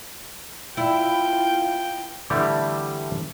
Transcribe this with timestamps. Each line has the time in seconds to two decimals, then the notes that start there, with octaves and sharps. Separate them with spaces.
0.77 E4 F4 G5
2.30 D3 E3 G3 A3 G4